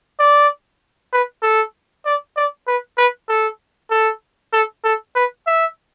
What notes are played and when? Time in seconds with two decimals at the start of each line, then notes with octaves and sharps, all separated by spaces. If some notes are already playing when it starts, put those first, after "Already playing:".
0.19 D5
1.13 B4
1.42 A4
2.05 D5
2.36 D5
2.67 B4
2.97 B4
3.29 A4
3.91 A4
4.53 A4
4.84 A4
5.15 B4
5.47 E5